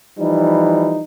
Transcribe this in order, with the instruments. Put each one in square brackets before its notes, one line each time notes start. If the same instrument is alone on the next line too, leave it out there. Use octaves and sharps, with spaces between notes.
[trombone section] E3 F3 G3 D#4